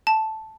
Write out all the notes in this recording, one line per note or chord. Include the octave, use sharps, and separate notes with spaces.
A5